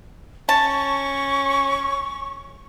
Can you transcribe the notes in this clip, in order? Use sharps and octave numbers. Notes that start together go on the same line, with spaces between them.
C#4 A5 C#6